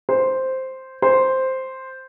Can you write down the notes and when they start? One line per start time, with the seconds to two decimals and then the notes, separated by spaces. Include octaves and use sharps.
0.09 C5
1.02 C5